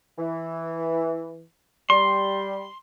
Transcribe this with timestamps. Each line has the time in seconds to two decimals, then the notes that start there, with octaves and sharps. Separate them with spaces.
0.19 E3
1.90 G3 C6